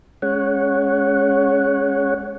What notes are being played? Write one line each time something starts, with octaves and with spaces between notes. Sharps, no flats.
G#3 C#4 C#5 F#5